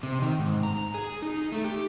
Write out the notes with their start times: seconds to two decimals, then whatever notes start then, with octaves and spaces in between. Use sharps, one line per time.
0.03 C3
0.22 D#3
0.39 G#2
0.63 A#5
0.94 G#4
1.22 D#4
1.52 A3
1.64 G4